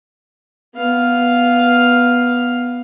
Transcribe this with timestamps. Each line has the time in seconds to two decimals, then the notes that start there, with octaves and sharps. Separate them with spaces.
0.74 B3 F5